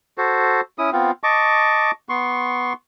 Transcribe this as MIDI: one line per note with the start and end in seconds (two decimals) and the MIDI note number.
0.18 0.61 66
0.18 0.61 69
0.18 0.61 72
0.78 0.90 61
0.78 0.90 64
0.78 0.90 87
0.92 1.11 59
0.92 1.11 60
0.92 1.11 65
1.23 1.91 75
1.23 1.91 81
1.23 1.91 85
1.23 1.91 86
2.09 2.73 59
2.09 2.73 84
2.09 2.73 85